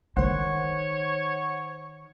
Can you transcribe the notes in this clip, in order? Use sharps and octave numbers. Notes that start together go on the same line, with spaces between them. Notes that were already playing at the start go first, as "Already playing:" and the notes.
D#3 D#4 C5 C#5 F#5